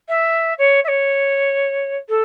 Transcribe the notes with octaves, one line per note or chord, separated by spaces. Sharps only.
E5
C#5
E5
C#5
A4